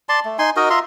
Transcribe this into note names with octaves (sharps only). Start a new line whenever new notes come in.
D5 A5 C6
A3
D#4 G#5 C6
D#4 F#4 A#4 D#5
F4 E5 A#5 C6